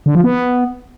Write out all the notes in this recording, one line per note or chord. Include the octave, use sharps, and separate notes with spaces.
D3
F3
B3